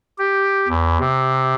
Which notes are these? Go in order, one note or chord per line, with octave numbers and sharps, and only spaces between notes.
G4
E2
C3